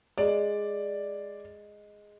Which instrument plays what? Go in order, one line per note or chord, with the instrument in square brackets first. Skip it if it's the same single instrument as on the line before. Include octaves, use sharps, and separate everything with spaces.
[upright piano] G#3 [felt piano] D5